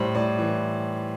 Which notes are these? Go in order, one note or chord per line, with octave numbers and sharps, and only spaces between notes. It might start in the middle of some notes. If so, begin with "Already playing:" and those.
Already playing: A2 G3 C5
A2 D5
E3